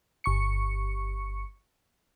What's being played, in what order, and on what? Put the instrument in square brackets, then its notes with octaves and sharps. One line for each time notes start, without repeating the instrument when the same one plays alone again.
[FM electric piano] G1 C#6 C#7